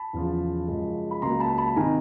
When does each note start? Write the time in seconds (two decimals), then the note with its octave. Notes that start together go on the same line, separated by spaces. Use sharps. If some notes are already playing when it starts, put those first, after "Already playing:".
Already playing: A5 B5
0.13 E2 C#3 F3
0.68 F#2 C#3 F3 G#3
1.11 B5
1.22 C#2 C#3 F#3 A#3 A#5 C6
1.40 A5 B5
1.58 A5 B5
1.76 C3 D#3 G#5 A#5